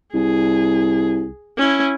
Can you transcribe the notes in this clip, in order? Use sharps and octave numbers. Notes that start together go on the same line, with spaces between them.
C2 G#4
C#4 E4